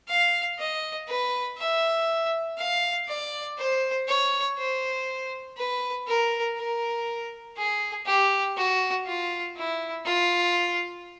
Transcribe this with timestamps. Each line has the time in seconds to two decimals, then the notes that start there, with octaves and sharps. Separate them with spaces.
0.08 F5
0.59 D#5
1.08 B4
1.58 E5
2.58 F5
3.08 D5
3.58 C5
4.08 C#5
4.58 C5
5.57 B4
6.07 A#4
6.56 A#4
7.57 G#4
8.06 G4
8.57 F#4
9.06 F4
9.56 E4
10.06 F4